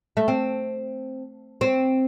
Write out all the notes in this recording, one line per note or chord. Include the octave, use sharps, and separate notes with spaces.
A3
C4
C4